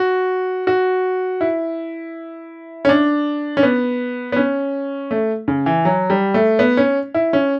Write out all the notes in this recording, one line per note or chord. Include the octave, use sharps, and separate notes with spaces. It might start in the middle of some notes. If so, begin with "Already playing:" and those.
Already playing: F#4
F#4
E4
C#4
D4
C#4
B3
B3
C#4
A3
C#3
E3
F#3
G3
A3
B3
C#4
E4
C#4